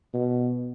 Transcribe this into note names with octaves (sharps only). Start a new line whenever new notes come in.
B2